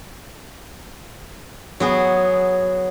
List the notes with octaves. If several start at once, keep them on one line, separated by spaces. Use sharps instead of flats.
F#3 B3 G#4